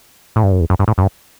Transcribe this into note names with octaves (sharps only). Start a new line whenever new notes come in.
A2
G2
F#2
E2
F#2
G2
A2
F#2
G2